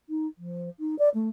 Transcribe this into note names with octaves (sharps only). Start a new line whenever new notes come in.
D#4
F3
D#4
D5
A3